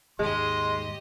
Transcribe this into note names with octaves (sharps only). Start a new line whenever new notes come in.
D#2 G#2 G#3 G4 D#5 C6